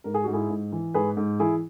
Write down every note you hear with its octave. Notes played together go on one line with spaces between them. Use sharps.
G#2 A#4
G#4
G#2 F#4
E4 G#4
G#2
E3
G#2 G#4 B4
G#2
E3 E4 G#4